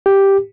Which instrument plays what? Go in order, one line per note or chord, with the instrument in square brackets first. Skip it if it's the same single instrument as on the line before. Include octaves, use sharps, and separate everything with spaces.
[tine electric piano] G4